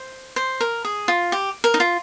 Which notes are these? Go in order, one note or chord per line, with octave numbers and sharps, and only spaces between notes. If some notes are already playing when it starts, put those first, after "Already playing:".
Already playing: C5
C5
A#4
G#4
F4
G4
A#4
D#4
F4